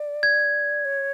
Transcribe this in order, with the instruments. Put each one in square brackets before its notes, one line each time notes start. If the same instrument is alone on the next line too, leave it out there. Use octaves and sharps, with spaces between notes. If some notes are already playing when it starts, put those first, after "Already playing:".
Already playing: [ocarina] D5
[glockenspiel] G#6
[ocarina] C#5